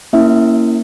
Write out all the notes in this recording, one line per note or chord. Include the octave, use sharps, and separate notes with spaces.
A#3 C#4 E4 E5